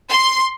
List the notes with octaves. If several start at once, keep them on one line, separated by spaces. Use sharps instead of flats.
C6